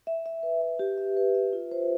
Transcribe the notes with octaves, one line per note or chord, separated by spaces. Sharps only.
E5
E5
B4
E5
G4
E5
B4
E5
F4
C5